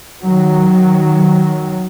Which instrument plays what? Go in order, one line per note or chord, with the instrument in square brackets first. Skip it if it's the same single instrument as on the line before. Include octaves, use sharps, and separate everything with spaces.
[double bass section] D#3 F#3